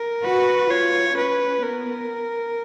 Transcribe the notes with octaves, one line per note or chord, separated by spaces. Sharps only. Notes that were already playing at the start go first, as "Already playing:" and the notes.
Already playing: A#4
F#4 B4
F4 C#5
C#4 B4
B3 A#4